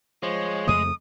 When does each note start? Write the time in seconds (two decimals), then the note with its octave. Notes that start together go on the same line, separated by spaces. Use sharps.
0.23 F3 G#3 C#5
0.67 F2 C#3 A3 D#6